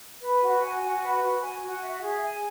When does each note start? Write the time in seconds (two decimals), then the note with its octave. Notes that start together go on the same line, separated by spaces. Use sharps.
0.22 B4
0.42 F#4
0.62 G#5
0.81 F#4
1.02 B4
1.21 F#4
1.42 G#5
1.61 F#4
1.82 E5
2.01 G#4
2.21 G#5